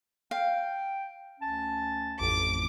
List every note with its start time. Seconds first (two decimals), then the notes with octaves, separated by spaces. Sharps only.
0.31 F5 G5
1.40 D2 C#4 A5
2.20 A1 F2 D6 D7